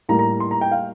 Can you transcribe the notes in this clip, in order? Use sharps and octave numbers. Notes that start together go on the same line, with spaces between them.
A2 G3 A#3 A#5
A#5
C6
A#5
G5
F5